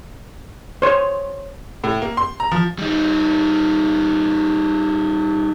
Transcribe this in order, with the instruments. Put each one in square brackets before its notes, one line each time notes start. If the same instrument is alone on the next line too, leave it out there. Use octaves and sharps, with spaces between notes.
[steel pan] C5 C#5
[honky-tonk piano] A2
A#3
C6
A#5
F3
[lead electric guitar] G3 D#4